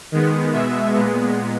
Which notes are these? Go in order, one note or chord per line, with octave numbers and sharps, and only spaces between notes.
D#3 G#3 B3
B2 G#3 B3 E5
A#2 G#3 B3